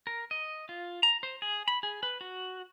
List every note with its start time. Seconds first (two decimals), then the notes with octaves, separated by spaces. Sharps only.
0.07 A#4
0.31 D#5
0.69 F4
1.03 A#5
1.23 C5
1.42 G#4
1.68 B5
1.83 G#4
2.03 B4
2.21 F#4